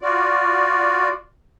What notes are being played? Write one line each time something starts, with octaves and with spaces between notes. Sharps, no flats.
F4 F#4 D5